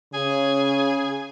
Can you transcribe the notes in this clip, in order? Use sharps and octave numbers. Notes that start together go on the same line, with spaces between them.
C#3 G#4